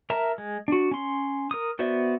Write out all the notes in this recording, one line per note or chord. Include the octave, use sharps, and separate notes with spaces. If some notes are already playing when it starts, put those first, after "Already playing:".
A#4 E5 A5 A#5
G#3
D4 F#4
C#4 C6
A#4 D#6
B3 F#4 C5 D5 E5